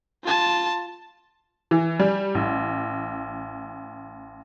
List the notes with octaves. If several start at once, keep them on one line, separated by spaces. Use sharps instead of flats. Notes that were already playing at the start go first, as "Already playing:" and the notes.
F4 A5
E3
G3
A1